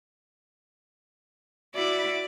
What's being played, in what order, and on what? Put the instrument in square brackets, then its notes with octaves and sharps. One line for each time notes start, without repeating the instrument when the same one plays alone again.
[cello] E4 F#4 [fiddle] D5